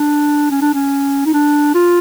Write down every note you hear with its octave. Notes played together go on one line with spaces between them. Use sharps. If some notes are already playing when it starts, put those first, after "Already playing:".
Already playing: D4
C#4
D4
C#4
D#4
D4
F4